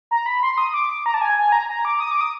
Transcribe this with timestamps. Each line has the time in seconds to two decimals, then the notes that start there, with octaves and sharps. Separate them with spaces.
0.11 A#5
0.26 B5
0.43 C6
0.58 D#6
0.74 D6
1.06 A#5
1.14 A5
1.21 G#5
1.38 G#5
1.52 A#5
1.69 A#5
1.85 D6
2.00 D#6
2.11 D6
2.21 D#6